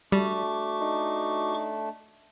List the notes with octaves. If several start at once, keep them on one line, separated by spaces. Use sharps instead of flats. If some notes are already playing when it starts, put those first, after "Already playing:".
G3 A3 D4 F#4 C#6 D6
D#4